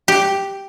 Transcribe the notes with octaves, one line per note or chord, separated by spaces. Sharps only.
G4